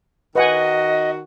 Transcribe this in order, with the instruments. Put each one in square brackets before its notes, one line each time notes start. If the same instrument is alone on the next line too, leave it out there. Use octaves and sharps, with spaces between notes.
[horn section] D#3 F#4 [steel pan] B4 F#5 G#5 [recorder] D#5